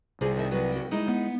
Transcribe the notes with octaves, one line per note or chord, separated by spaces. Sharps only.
C2 C3 F4 G#4
D#3 E5
F#3 F#4 B4
F#4 G5
G#3 D#4 E4
B3